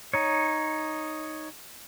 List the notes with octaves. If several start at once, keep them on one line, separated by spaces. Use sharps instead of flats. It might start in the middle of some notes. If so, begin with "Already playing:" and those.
D#4 C#5